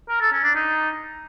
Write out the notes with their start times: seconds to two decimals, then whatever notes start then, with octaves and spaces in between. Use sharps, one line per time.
0.09 A#4
0.21 A4
0.32 C#4
0.44 D4
0.55 D#4